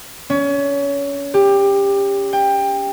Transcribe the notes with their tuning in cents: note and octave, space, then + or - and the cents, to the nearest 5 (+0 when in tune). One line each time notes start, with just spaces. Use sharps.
C#4 +25
G4 +20
G5 +20